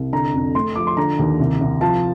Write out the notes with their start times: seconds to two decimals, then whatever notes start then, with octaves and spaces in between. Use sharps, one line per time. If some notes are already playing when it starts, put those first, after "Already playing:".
Already playing: C2
0.12 D3 A#5
0.34 F2
0.55 A3 C6
0.76 F3 D6
0.87 C6
0.97 D3 A#5
1.19 D#2
1.39 C2
1.60 C2
1.81 F3 A5